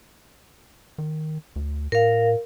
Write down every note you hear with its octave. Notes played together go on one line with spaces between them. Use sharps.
D#3
D2
A2 A#4 F5